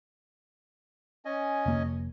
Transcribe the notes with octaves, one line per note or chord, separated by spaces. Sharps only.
C#4 D#5 G#5
F1 A#3